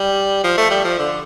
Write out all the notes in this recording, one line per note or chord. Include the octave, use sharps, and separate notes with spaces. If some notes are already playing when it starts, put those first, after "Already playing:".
Already playing: G3
F3
A3
G3
F3
D3